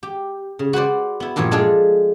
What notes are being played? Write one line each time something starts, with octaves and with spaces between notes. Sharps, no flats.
G4
C#3
F#4 B4 C5 D5
B3 E4
G2 A#2 E3 F3 C#5
G#3 D4 F4 G#4 A4